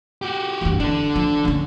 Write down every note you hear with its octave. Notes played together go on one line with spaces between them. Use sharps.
F#4 G4
G2 E3
D4 E4 A4
F3
D3 C#4